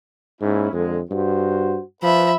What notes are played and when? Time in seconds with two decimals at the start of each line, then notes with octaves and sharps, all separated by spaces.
0.41 G#2 A#3 C#4 E4
0.73 F2 D3 G#3
1.11 G2 F#4 C5
2.03 F3 B4 E5 B5